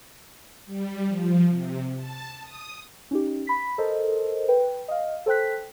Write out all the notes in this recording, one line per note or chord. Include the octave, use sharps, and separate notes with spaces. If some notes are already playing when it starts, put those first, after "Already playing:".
G3
F3
C3
A5
D#6
C#4 D#4 G4
B5 B6
A4 A#4 C5 D#5
B4 G5
D#5 F5
A4 C5 G5 F#6 B6